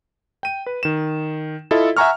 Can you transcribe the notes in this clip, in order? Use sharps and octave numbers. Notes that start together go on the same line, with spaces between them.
G5 D#7
B4
D#3 E7
E4 F4 A4 D#5 E5
E5 F#5 G#5 A#5 C#6 F6